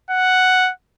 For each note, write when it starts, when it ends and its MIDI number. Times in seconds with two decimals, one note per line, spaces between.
0.10 0.71 78